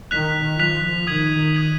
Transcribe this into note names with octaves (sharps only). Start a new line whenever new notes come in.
D#3 F#6 B6 F7
F3 F#6 B6 F7
D#3 D#6 G#6 D#7 F#7
D#6 G#6 D#7 F#7